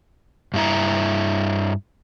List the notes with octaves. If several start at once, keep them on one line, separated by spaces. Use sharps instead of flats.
G2 E4 A#5